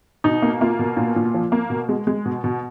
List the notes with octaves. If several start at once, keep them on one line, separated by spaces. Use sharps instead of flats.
B2 D#4
A#3
A#3 F4
B2
A#2
A#2
F3
A#3
B2
G#3
G#3
B2
B2